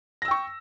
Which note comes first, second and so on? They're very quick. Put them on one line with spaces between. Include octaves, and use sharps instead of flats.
A#6 E6 G5 C#6